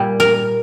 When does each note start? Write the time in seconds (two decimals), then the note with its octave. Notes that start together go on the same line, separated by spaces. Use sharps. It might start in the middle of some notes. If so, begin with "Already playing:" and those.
Already playing: A#2 G3 G4
0.20 A#4